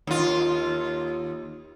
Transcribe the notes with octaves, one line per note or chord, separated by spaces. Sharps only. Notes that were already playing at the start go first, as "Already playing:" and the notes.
D#2 F4